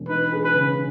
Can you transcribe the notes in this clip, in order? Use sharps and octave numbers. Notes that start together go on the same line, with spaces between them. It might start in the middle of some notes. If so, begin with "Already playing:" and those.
Already playing: E1
D#4 B4
G#4
B4
C#3